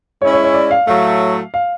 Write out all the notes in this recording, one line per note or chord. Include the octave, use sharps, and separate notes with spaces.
G#3 C#4 E4 C#5
C#5
C#5
D5
F5
A2 F#3 A3 F5
F5